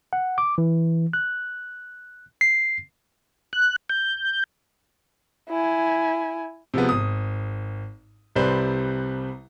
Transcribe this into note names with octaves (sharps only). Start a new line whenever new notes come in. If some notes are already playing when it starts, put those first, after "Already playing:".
F#5
D6
E3
F#6
C7
F#6
G6
E4 G#5
C3 F3 G#3 B3
G#1 D#6
C2 C3 G3 B4 C5